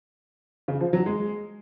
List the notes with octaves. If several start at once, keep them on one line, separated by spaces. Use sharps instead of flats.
C#3
F3
F#3
G#3